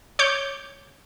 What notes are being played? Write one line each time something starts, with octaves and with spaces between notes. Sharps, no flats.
C#5 D6 G6